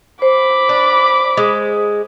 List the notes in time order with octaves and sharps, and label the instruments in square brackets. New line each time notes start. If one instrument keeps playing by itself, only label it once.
[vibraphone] C5 [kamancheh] B5 D6
[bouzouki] D4
G#3